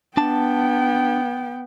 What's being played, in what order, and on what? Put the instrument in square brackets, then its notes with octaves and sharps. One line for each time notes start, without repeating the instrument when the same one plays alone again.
[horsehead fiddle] B3 G5 [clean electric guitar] D4 A5